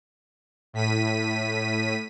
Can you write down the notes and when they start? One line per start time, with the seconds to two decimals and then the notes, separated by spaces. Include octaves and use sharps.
0.73 A2 B6 D#7